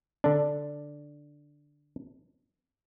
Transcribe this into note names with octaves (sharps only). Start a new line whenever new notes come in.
D3 D4